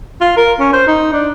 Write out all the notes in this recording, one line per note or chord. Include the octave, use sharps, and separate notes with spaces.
F4
A#4
C#4
C5
D#4
D4